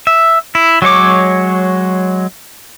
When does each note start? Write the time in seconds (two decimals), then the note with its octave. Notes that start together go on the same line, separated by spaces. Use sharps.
0.07 E5
0.55 E4
0.82 F#3 G#3 C#5 D6